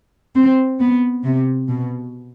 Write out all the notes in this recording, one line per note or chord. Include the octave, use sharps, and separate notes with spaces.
C4
B3
C3
B2